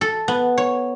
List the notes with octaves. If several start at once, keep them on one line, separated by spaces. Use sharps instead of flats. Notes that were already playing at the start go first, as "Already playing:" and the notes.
A4
B3
C#5